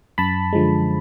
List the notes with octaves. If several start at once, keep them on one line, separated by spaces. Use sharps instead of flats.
F#2 A5 B5
D3 F3 G#3